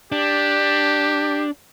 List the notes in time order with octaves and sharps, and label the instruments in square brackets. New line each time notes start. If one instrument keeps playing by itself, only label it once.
[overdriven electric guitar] D4 [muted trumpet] G4